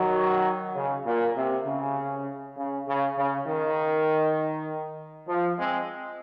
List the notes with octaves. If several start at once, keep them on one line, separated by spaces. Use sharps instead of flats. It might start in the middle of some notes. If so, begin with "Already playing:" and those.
Already playing: D#3 F#3
C#3
A#2
C3
C#3
C#3
C#3
C#3
D#3
F3
G#3 C4